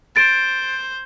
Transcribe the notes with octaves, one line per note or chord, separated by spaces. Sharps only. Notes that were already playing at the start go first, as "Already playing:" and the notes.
C5 A6 D7